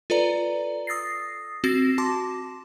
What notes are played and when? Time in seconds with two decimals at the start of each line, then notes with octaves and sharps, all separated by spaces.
0.10 F4 A4 B4 D5 A#5
0.87 D#6 E6 A6 A#6 C7
1.64 C4 F#4 A6 A#6 C7
1.98 F#4 A5 C6 D6